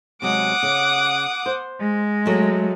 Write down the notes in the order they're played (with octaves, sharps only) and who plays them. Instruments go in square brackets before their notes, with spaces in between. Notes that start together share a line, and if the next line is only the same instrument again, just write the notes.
[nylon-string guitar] C3 F#3 G#3 [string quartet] F#5 D6 D#6
[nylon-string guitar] C#3
C5
[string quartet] G#3
[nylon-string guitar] F#3 A3